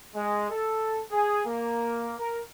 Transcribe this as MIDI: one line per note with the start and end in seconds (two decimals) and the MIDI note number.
0.15 0.50 56
0.50 1.01 69
1.12 1.43 68
1.46 2.13 58
2.19 2.39 70